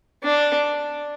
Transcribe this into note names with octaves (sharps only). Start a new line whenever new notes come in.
D4